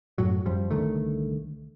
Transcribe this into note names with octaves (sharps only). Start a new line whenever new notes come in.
F#2 A2 F#3
F#2 F3 G3
C2 D3 D#3 A3